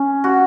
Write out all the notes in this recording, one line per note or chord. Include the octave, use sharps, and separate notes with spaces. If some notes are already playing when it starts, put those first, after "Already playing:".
Already playing: C#4
F#4